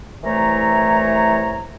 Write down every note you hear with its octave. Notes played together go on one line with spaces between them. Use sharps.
C2 E3 A3 C#5 A#5